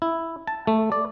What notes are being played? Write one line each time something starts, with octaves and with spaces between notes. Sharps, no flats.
E4
A5
A3
D5